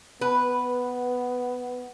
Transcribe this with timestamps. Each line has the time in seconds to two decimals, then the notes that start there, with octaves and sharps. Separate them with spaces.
0.21 B3 B4